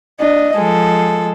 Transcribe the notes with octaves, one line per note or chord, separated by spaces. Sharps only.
D4 D#5
F3 G#3 A4